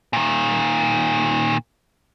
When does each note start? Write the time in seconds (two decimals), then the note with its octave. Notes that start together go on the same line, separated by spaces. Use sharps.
0.13 A#2 D#3